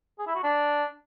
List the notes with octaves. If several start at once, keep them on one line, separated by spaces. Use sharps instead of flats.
G#4
E4
F#4
D4